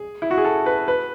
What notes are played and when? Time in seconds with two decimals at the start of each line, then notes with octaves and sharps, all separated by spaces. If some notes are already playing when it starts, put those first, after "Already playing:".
Already playing: G#4
0.22 E4
0.31 F#4
0.38 G#4
0.44 A4
0.66 B4
0.88 B4